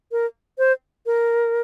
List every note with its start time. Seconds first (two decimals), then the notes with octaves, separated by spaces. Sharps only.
0.12 A#4
0.58 C5
1.06 A#4